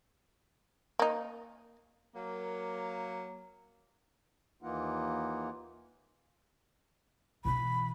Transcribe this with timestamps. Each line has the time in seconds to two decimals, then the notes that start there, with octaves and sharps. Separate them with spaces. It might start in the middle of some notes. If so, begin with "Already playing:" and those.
0.99 A#3 D#4
2.15 F#3 A#3
4.63 D#2 E3 A#3 D#4 F4 F#5
7.45 B2 E3 B5